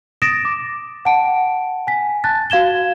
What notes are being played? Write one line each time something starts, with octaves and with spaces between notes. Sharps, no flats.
D#6 A6 A#6 D7 E7
D6
F#5 G5 A5 D7
G#5 B6
A5 F#6 A6
F#4 F5 G#6 E7 G7